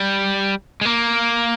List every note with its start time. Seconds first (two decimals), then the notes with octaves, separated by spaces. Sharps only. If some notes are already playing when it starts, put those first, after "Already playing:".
Already playing: G3
0.81 G#3
0.86 A#3